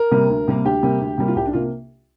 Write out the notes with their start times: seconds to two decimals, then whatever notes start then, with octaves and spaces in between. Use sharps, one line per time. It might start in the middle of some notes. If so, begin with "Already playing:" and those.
Already playing: A#4
0.11 C3 G3 A#3
0.30 D2
0.48 C3 G3 A#3
0.65 D2 G4
0.83 C3 G3 A#3
1.01 D2
1.18 C3 G3 A#3
1.28 F4
1.36 C2 G4
1.46 D4
1.53 C3 A#3 F4